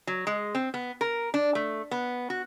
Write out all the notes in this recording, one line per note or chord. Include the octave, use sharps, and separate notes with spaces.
F#3
G#3
C4
B3
A#4
D4
A3
B3
F#4